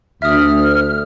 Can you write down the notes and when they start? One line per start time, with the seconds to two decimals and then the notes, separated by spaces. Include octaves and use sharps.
0.22 D2 E5 D#6 F6